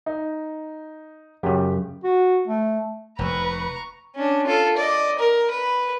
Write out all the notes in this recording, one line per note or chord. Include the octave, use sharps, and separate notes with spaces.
D#4
F#2 C#3 G4
F#4
A3
F1 D#2 B4 A#5 C#6
C#4 D4
F4 A4
D5 D#5
A#4
B4